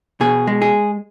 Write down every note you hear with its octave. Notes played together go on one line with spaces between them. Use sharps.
B2 G#4
G#3
G#4